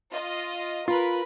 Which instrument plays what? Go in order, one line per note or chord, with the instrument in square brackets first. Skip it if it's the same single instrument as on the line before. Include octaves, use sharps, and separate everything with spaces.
[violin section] F4 D#5
[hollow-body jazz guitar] F4 [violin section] A#4 B4 B5